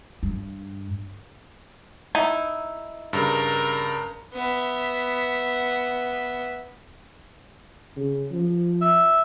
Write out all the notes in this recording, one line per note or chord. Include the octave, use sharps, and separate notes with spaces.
G2
D#4 E4
G2 C#3 A#4
B3 E5
C#3
F3
E5